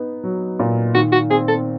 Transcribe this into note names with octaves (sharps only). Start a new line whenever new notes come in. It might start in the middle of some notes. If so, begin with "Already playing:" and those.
Already playing: B3 D#4
F#3
A#2
D#3 F#4
F#4
C4 G#4
A4